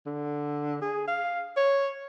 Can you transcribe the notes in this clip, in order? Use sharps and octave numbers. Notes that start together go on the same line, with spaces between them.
D3
G#4
F5
C#5